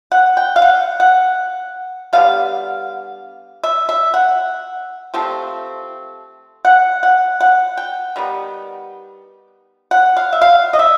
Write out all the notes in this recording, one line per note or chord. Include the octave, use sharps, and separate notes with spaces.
F#5
G5
F5
F#5
F#5
D3 G3 B3 F5
E5
E5
F#5
C3 F3 A3 C4
F#5
F#5
F#5
G5
D#3 G3 B3
F#5
F5
E5
F5
D#5
E5